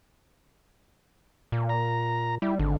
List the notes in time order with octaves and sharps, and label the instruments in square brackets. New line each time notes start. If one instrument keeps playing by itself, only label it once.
[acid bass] A#2
[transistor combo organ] A#5
[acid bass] G3 [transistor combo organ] E4
[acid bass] G#1 [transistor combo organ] D3